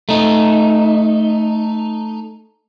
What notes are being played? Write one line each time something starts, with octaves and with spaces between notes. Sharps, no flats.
A3 D#4